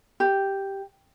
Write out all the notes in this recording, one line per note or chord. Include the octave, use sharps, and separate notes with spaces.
G4